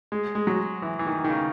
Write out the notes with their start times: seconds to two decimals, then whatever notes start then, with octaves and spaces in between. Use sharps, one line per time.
0.12 G#3
0.35 G#3
0.47 F#3
0.82 E3
0.99 E3
1.07 D#3
1.24 D#3
1.30 C#3